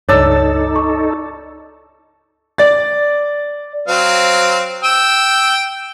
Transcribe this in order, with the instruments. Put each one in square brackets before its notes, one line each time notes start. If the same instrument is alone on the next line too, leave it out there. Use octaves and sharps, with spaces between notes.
[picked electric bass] C#2 G2 [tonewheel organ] D#4 A4 [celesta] C#5 [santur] D5 A5 E6
[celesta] C#6
[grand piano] D5 A6
[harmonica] F#3 C4 F5
G5 E6